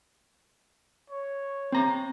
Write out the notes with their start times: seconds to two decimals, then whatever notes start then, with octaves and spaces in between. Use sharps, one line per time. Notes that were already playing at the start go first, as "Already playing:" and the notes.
1.10 C#5
1.72 C4 A#5